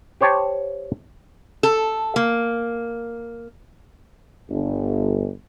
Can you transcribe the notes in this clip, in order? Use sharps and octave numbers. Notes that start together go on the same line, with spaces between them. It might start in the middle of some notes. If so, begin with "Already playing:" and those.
G4 C5 C#5 G5 A5
A4
A#3
G1